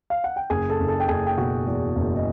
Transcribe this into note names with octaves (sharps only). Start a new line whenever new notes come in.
F5
F#5
G5
F#1 G#4 G#5
A4 A5
F#1
A4 A5
G5
F#1 G#4 G#5
G5
B2 F#4 F#5
E2
F#1
D#5